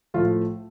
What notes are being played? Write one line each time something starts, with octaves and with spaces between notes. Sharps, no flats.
A2 F3 A3 F4